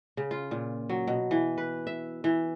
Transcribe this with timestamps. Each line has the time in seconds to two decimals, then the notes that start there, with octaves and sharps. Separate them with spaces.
0.17 C#3
0.31 F4
0.51 A#2
0.89 F#3
1.07 B2
1.31 E3
1.58 B4
1.87 E5
2.24 E3